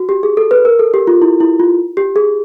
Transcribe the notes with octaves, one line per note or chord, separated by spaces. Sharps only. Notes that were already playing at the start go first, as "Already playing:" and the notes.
Already playing: F#4
G4
G#4
A4
B4
A#4
A4
G4
F4
E4
E4
F4
G4
G#4